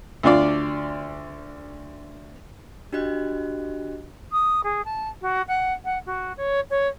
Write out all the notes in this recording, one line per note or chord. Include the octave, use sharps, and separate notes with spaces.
D2 D4 F4 D5
D4 F#4 G4 D#5 F#6
D#6
G#4
A5
F#4
F#5
F#5
F#4
C#5
C#5